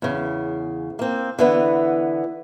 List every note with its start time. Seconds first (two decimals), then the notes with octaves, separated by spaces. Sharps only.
0.02 E2 C#3
0.99 A#3 C4
1.39 D3 E3 B3